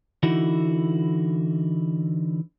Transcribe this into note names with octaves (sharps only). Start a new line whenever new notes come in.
D3 E3 D#4 E4 F#4